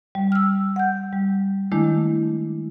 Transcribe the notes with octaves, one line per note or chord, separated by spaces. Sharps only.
G3
E6 F6
F#5 G6
G3
D#3 G#3 A3 D4 E4